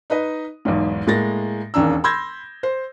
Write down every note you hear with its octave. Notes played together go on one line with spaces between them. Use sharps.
D#4 B4 D#5
B1 E2 G#2
A2 G#3 A#3 A6 A#6
E1 D#2 C#4 D4 A#5 E6
B5 C6 E6 G6 G#6 A#6
C5